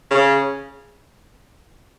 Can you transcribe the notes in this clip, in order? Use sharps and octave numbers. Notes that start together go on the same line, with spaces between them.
C#3